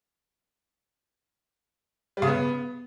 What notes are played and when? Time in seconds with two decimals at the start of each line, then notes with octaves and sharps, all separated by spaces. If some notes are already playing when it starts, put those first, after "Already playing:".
2.17 G3
2.22 C#3
2.27 B3